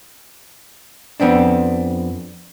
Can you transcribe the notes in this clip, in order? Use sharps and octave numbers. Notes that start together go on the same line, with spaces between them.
F2 B3 C4 D4